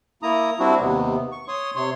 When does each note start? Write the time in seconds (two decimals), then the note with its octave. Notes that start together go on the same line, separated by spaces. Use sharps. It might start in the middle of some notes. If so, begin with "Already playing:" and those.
0.23 A#3 E4 A#5 D#6
0.60 G3 C4 D4 E4 F#4
0.80 D#2 C3 B3
1.32 C#6
1.48 C#5 C6 D#6
1.76 C3 C#5 C6